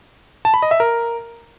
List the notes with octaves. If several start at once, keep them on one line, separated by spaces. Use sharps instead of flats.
A5
B5
D#5
E5
A#4